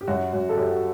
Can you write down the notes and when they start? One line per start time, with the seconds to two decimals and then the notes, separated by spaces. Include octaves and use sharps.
0.01 G4
0.07 F#2 F#4
0.33 F#2
0.49 A4
0.57 F#2 G4
0.71 F#4